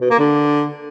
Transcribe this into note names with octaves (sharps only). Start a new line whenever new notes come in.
B2
A#3
D3